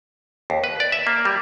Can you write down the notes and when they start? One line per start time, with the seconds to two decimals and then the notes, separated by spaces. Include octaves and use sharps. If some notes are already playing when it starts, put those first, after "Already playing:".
0.50 D#2
0.64 B4
0.80 D5
0.92 E5
1.07 A#3
1.25 G3